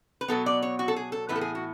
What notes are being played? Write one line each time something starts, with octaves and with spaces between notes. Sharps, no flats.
B4
B2 F#3 B3 A4
D5
C#5
F#4
A4
G#4
A4
A2 E3 B3 B4
A4
G#4
F#4